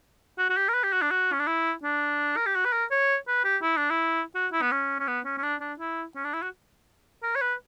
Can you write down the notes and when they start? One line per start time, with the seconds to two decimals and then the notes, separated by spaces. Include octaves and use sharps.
0.39 F#4
0.50 F#4
0.57 G4
0.69 A#4
0.74 B4
0.83 G4
0.93 F#4
1.02 D4
1.11 F#4
1.33 C#4
1.40 D4
1.47 E4
1.83 D4
2.37 A#4
2.46 G4
2.55 F#4
2.65 B4
2.72 A#4
2.91 C#5
3.27 B4
3.44 G4
3.62 E4
3.77 D4
3.90 E4
4.35 F#4
4.52 E4
4.62 B3
4.72 C#4
4.99 C#4
5.07 B3
5.25 C#4
5.38 C#4
5.43 D4
5.60 D4
5.79 E4
6.16 C#4
6.24 D4
6.34 E4
6.42 F#4
7.23 A#4
7.36 C#5
7.41 B4